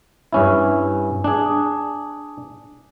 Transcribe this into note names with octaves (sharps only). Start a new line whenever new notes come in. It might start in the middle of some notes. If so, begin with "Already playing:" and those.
G2 C#4 E4
D4 G#4